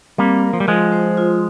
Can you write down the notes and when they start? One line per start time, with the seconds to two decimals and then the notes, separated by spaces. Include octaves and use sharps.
0.18 G3 A#3 C4
0.43 A#4
0.53 F3
0.60 G3
0.68 F3 G#3 F4
0.92 C5
1.17 F4